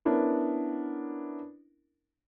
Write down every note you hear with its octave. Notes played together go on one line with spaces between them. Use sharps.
B3 C#4 D4 E4 A#4